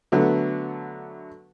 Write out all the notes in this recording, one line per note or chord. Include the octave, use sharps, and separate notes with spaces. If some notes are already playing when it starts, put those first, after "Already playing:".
D3 F#3 A3 B3